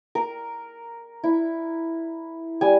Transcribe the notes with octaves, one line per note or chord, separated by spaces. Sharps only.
A#4
E4
G3 G#5